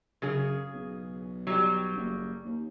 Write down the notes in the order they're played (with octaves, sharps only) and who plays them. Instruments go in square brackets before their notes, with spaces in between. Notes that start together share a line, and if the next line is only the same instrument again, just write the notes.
[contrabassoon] F#2 [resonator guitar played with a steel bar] C#3 G#4
[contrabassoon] B1
[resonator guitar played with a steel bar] F#3 G3
[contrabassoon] F#1
D#2